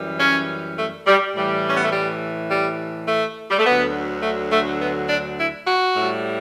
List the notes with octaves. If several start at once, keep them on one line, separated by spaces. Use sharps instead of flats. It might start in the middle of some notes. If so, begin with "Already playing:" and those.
Already playing: F#2 E3 G3
C#4
A3
G3
A2 E3 G3
C#4
B3
A3
G3
G3
A3
G3
A3
D2 D3 F#3 B3
A3
A3
B3
D4
E4
F#4
A2 G3